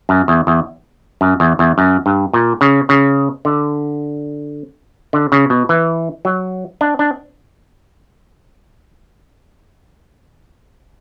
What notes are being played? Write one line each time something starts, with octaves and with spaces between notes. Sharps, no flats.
F#2
E2
E2
F#2
E2
E2
F#2
G2
A#2
C#3
C#3
D3
D3
C#3
B2
E3
F#3
D4
D4